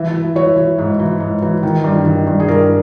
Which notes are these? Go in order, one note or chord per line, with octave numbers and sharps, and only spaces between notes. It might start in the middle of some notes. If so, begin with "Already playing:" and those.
Already playing: E3 E5
E3
E3 C#5
E3
G#2
E3
G#2
E3
D#3
G2
D#3
G2
G#4
G2 A#4